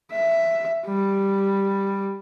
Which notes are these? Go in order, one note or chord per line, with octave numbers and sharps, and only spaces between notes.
E5
G3